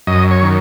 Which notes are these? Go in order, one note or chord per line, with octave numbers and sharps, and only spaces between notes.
F#2 D#5
C#5
D#3